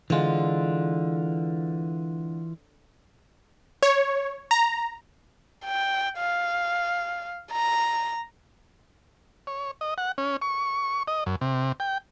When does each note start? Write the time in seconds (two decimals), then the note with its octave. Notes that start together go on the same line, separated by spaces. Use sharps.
0.10 D3 E3 G#3 F4
3.83 C#5
4.51 A#5
5.64 G5
6.18 F5
7.52 A#5
9.47 C#5
9.81 D#5
9.98 F#5
10.18 C#4
10.42 C#6
11.08 D#5
11.26 F#2
11.41 C3
11.80 G5